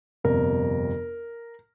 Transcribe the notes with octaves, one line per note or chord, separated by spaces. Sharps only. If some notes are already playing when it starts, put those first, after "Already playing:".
G1 F2 C3 A#4